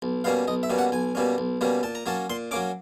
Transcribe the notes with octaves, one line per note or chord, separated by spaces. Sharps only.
B1
B2 G3 A#3 C#4 F5
B1 D#5
E5
B2 G3 A#3 C#4
F#5
B1 G#5
B2 G3 A#3 C#4
B1
B2 G3 A#3 C#4
A#2 A5
A#5
F#3 A#3 C#4 A5
A#2 C6
F#3 A#3 C#4 D6